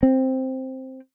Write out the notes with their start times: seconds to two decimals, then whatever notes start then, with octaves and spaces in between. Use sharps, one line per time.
0.03 C4